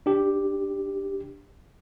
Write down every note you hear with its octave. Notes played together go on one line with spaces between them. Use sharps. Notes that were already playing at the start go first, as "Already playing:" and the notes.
D4 G4